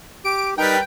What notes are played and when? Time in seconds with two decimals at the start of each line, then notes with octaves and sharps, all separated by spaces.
0.25 G4 D7
0.58 G3 D#4 A#4 B4 G5